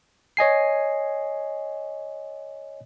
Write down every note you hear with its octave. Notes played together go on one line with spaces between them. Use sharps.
C#5 D#5 G#5 C7